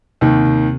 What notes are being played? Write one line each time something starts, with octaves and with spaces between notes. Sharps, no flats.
D#2 C3 D#3
C3